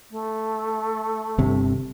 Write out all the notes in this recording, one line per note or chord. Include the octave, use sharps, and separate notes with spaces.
A3
G1 C3